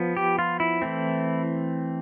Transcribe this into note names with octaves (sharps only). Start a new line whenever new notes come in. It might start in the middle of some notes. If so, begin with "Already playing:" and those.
Already playing: F3 B3
G4
F4
E4
E3 A3 C4